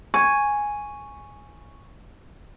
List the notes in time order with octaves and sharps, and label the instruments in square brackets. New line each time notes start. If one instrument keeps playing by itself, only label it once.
[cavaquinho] G#5 [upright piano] C#6